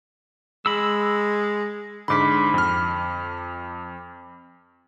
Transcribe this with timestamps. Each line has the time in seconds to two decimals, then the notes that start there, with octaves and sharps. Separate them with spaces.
0.66 G#3 B5 E6
2.08 G#2 D3 B5 D6 B6
2.54 F2 F6